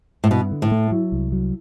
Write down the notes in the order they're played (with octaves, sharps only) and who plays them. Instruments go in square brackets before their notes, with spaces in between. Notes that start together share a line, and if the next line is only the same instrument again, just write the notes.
[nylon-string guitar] A2
[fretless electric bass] G2 [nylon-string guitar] B2
[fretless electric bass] D3
[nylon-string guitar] A2
[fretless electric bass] A3
F#3
C2
F#3